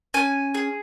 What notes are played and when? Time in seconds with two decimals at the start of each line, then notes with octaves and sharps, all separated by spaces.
0.14 C#4 G#5
0.54 G#4